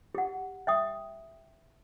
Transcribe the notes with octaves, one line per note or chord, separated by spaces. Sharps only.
G4 F#5
E5 G5 D#6